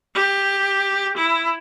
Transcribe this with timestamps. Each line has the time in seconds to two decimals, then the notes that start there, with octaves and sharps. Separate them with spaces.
0.15 G4
1.17 E4